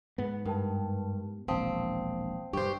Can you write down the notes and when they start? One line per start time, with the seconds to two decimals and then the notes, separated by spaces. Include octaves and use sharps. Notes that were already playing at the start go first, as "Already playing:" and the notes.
0.18 G#2 B3
0.46 G2 A#4 G5 A5
1.48 E1 A#1 C4 F5 A5 D#6
2.53 G2 G4 C5 C#6